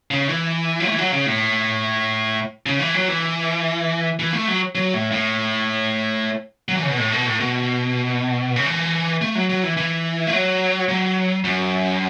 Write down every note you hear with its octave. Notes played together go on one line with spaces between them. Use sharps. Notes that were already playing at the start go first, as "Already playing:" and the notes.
C#3
E3
F#3
A3
E3
F#3
C#3
A2
C#3
E3
F#3
E3
E3
A3
F#3
F#3
A2
A2
F#3
E3
C#3
B2
A2
B2
A2
B2
C#3
E3
A3
F#3
F#3
E3
E3
A3
F#3
F#3
F#2